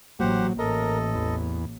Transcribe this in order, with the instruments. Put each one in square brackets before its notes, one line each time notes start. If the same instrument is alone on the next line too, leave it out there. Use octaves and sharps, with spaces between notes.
[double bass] A1 [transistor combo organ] F#3 [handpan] A#3 [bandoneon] G4 C5 F#5
[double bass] A1 [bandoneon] A4 D#5 [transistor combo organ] A#4
[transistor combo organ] E2